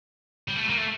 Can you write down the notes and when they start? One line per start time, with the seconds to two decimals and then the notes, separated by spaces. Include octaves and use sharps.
0.48 G3
0.56 A3
0.69 A#3
0.77 A3